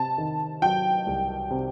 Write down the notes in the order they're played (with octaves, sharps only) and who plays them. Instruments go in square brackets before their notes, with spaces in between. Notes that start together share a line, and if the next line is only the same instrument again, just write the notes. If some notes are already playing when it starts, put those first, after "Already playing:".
Already playing: [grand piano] C3 [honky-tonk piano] A5
[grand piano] D#3
[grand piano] F#3 [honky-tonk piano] G5
[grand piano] C2
C3